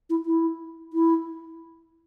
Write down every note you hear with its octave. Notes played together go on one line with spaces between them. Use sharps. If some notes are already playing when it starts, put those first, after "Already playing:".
E4
E4
E4